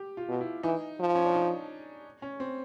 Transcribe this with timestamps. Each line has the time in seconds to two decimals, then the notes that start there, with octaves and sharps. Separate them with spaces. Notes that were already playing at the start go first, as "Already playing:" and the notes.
Already playing: G4
0.17 F4
0.29 B2
0.41 E4
0.63 E3 D#4
1.00 F3
1.15 C#4
1.25 D4
1.35 D#4
2.22 C#4
2.40 C4